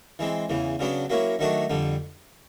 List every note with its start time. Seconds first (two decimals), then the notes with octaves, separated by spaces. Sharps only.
0.19 E3 G#3 C4
0.49 E2 C#3 E3
0.79 C#3 F#3 B3 D4
1.10 F#3 A#3 C#4 E4
1.39 D#3 F#3 A3 D4 F#4
1.70 F2 D3 G3